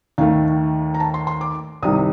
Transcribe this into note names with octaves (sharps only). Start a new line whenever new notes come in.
D#2 D#3 A3 F5
A#5
A5
C6
C6
D6
C2 C3 D#3 G3 D#6